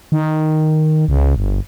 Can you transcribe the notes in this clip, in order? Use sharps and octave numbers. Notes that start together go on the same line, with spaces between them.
D#3
C#2
G1